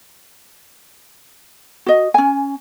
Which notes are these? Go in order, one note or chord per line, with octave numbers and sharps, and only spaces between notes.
F#4 D#5
C#4 G#5